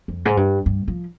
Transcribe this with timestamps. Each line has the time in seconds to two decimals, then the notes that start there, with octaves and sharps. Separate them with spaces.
0.08 F2
0.25 G#2
0.37 G2
0.66 G2
0.88 F3